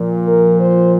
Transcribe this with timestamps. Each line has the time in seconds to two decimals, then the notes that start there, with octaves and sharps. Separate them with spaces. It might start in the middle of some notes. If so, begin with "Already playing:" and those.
Already playing: A#2 F3
0.26 A#4
0.59 C5